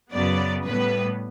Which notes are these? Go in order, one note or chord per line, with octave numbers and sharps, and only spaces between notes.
F#2 C#3 F#3 B3 D5
A2 G3 B3 B4